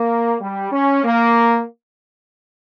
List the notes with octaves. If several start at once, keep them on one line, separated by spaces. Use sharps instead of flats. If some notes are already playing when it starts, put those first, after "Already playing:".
Already playing: A#3
G3
C#4
A#3